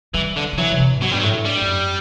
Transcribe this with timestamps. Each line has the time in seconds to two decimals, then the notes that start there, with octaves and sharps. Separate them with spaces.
0.14 E3 G3
0.36 D3
0.53 D3
0.58 E3 F#3
0.72 C3
0.80 D3
0.95 A2
1.01 B2 F#3
1.11 G2 G3
1.20 F#3
1.23 A2
1.45 G2 G3
1.61 G2
1.67 F#2